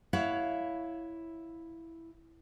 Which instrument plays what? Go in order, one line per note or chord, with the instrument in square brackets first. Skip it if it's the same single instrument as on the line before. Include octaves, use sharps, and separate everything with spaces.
[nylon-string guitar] E4 C#5 F5 F#5